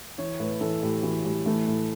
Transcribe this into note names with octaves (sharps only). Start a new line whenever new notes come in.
E3 C#5
A2 B4
E3 A4
A2 G4
E3 F#4
A2 G3
E3 A3
A2